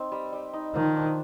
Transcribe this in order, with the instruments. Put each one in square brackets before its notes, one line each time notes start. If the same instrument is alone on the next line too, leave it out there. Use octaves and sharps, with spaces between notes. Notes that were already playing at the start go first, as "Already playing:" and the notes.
Already playing: [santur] C4 D#4
G3
G3
D#4
[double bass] D#3 [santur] F3
[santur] D4